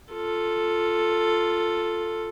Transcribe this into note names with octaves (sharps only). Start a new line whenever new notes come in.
F4 A4